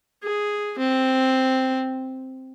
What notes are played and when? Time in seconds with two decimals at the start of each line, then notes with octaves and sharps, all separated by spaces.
0.23 G#4
0.78 C4